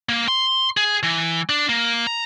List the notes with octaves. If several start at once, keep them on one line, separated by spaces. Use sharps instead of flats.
A#3
C6
G#4
E3
D4
A#3
A#5